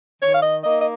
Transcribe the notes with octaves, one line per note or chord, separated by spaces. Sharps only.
D#3 C#5
F5
D#5
A#3 D#4 D#5
D#5